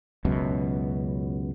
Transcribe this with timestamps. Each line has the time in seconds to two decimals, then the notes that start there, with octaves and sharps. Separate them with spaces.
0.25 C#2 F#2 B2